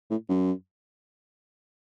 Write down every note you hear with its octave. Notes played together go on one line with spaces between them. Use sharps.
A2
F#2